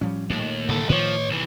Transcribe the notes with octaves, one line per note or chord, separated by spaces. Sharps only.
A2 F3 G3 C#4
D#2 A#2 A3 A#3
C2 A2 D3 A4
A2 D#3 F3 B4 C#5
B1 E3